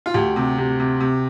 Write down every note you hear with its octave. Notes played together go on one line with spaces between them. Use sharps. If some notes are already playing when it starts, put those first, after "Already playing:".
F4
D2 G4
C3
C3
C3
C3